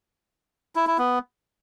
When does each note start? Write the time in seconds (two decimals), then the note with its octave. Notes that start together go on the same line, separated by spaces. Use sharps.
0.75 E4
0.87 E4
0.98 B3